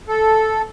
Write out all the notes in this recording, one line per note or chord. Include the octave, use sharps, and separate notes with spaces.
A4